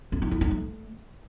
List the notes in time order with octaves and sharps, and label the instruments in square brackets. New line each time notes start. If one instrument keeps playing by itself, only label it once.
[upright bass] C#4
D#4
E4
D#4
A3